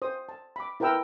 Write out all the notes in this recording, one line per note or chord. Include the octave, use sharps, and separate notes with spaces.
C5 D#6
A5
B5 D6
E4 A#4 B4 G5 A#5 E6